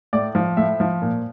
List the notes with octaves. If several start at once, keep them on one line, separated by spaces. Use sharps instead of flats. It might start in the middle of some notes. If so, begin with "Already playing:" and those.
A2 D5
F3
A2 E5
F3
A#2